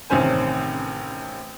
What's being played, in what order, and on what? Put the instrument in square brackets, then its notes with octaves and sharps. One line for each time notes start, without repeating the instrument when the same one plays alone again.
[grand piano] A1 C3 D#3 C#4 C5 G#5